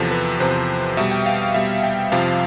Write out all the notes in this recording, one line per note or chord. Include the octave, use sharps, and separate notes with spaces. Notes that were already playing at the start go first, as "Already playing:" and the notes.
Already playing: E2 C3 F3 A4
B4
E2 C3 F3 C5
B2 G3 E5
G5
F5
B2 G3 E5
G5
F2 C3 F3 F5